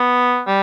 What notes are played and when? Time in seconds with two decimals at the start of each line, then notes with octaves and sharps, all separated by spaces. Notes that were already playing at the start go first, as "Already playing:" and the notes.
Already playing: B3
0.48 G3